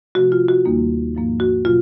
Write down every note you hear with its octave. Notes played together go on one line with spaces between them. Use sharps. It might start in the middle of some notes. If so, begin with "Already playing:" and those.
C3 F3 A3 F#4
F4
F#4
D#2 D#3 G3 A#3 D#4
G#2 F3 A#3
F#4
B2 F#3 F4